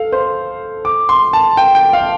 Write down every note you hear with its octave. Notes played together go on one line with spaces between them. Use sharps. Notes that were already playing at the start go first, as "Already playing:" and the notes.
Already playing: A4 F5
C5
D6
C6
A5
G5
G5
F5